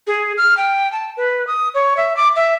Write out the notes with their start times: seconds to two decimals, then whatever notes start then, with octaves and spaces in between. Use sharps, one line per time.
0.07 G#4
0.38 F6
0.57 G5
0.92 A5
1.17 B4
1.47 D#6
1.74 C#5
1.97 E5
2.17 D6
2.36 E5